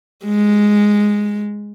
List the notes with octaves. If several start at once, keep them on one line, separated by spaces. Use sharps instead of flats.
G#3